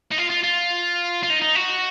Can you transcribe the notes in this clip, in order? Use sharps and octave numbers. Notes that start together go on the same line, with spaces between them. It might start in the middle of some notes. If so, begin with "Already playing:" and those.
D#4
F4
F4
F4
F4
D#4
D#4
F#4